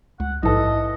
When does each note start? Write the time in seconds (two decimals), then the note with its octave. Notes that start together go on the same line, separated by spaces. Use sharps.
0.20 C#2 F#5
0.43 A#1 G#2 E3 A4 D#5